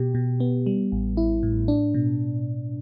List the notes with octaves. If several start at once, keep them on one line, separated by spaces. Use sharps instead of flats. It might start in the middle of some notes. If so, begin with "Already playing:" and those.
Already playing: B2 G4
B2
B3
G3
A1
E4
A2
D4
B2